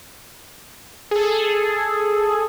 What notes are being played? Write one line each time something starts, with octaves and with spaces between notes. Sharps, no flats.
G#4 A4